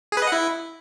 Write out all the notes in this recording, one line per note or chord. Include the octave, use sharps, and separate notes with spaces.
G#4
B4
D#5
F#5
E4